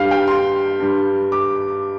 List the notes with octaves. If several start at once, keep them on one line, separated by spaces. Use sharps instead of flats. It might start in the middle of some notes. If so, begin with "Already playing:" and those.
Already playing: G2 G3 F5
G5
C6
G2 G3
D6